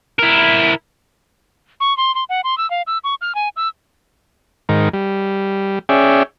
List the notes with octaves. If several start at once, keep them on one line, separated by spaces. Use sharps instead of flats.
E4 A#4
C#6
C6
C6
F#5
C6
E6
F5
E6
C#6
F6
G#5
E6
G#2 D#3 A#4
G3
C#4 G#4 D5 E5 G5